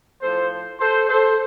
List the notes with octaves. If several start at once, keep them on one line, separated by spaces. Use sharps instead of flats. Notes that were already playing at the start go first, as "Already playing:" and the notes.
A2 F3 A4 C5
A4 C5
A4 C5